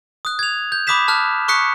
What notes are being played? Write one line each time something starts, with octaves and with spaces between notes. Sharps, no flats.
D#6 F#6
G#6 F7
G6
B5 D6 D#6 F#6 B6 E7
A5 F6 F#6
C#6 D#6 F#6 B6 C#7